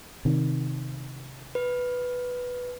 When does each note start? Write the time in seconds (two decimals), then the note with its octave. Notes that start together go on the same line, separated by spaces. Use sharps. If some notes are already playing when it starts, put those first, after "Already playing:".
0.25 C3 D#3
1.55 B4